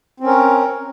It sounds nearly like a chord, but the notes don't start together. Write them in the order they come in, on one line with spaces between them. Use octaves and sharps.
C4 C#4 A#4